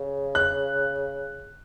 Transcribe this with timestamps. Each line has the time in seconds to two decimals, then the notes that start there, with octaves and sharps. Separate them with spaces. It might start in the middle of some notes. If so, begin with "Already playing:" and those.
Already playing: C#3
0.35 F#6